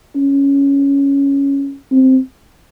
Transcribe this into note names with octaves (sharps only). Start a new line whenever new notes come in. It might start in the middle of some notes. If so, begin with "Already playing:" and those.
C#4
C4